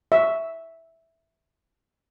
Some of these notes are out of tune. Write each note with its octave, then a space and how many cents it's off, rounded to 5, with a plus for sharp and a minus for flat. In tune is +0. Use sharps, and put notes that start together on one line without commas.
E5 -5